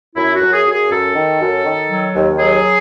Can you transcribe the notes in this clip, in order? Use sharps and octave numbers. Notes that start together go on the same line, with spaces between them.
F#2 E4
F#4
F#2
G#4
F#2
G#4
F#2 A4
D#3
F#2
D#3
F#3
D#2
F#3 G#4